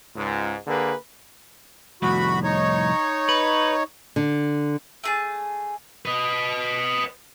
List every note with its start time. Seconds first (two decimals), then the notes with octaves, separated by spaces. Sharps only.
0.16 C#2 G#2
0.66 D3 A#3 G#4 B4
2.02 C2 F2 A2 F#4 B5
2.43 D#4 C#5
3.29 B4
4.16 D3
5.04 A3 G#4 A5
6.05 B4 D#5